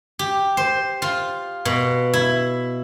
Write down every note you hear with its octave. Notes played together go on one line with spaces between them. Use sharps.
G4
C5
F4
B2
E4